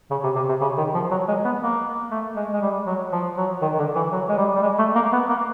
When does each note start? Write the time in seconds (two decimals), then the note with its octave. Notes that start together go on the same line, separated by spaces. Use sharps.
0.11 C#3
0.24 C3
0.36 C3
0.49 C3
0.61 C#3
0.78 D#3
0.95 F3
1.11 F#3
1.28 G#3
1.45 B3
1.62 A#3
2.11 A3
2.36 G#3
2.53 G#3
2.62 G3
2.87 F#3
3.12 F3
3.37 F#3
3.62 D#3
3.74 D#3
3.78 D3
3.95 E3
4.12 F#3
4.29 G#3
4.37 G3
4.55 G3
4.63 G#3
4.79 A3
4.95 A#3
5.13 B3
5.29 A#3